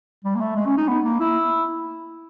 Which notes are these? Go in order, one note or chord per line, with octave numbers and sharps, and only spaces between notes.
G3
A#3
A3
G#3
C#4
D#4
B3
A#3
E4